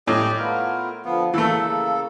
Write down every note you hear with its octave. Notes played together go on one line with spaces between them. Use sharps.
A2 G4 D5 D#5
A3 B3 F4 A#4
D3 F3 B3 F5
C#3 E3 A3 A#3 A4